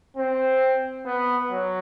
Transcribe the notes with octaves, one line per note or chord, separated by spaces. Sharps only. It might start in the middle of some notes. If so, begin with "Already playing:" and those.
C4
B3
F#3